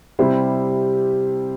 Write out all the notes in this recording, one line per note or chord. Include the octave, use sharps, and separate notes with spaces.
C3 G3 E4 G4 C5